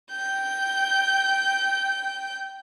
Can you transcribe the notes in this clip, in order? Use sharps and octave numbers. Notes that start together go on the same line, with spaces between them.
G5 G6